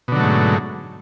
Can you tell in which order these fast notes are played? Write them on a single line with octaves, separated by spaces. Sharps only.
B2 D3 F#3 A3 G#2